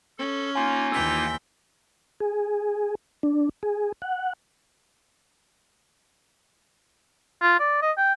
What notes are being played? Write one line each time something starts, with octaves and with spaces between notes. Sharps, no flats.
C#4 A4
A#3 D#4 F4 G#5 C6
D#2 E3 G5 E6 B6
G#4
D4
G#4
F#5
F4
D5
D#5
G5